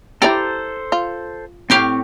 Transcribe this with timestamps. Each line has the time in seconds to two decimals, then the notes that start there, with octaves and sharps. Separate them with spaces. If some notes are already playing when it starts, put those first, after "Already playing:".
0.22 E4 G4 A4 C5 D5 A#5
0.92 F4
1.70 A2 C4 G4 F5 C#6